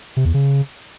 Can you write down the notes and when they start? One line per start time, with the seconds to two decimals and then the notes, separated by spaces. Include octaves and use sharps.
0.17 C3
0.25 E2
0.34 C#3